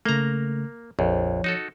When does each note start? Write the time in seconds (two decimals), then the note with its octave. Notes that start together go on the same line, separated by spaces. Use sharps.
0.06 C#3 A3 A#3 A#5
0.99 A#1 F2 F3 C#5
1.44 D#4 F#4 A4